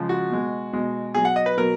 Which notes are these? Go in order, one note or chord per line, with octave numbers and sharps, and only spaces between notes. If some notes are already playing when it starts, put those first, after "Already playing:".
Already playing: C#3 F3 G#3
F#4
B2 G#3
B2 G#3
B2 F#3 G#4
F#5
D#5
B4
B2 F#3 A#4